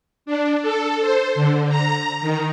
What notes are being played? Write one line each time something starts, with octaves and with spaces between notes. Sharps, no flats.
D4
A4
C5
D3
A#5
D#3